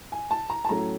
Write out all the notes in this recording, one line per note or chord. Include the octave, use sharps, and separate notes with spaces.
G#5
A5
A#5
A5
A2 F#3 A3 C#4 A#5